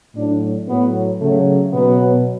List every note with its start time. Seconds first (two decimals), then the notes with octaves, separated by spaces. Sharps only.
0.15 A2 F#3 D4
0.68 A2 F#3 B3
1.20 C#3 F#3 A3
1.73 B2 F#3 B3